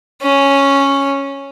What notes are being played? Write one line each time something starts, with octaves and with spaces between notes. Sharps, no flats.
C#4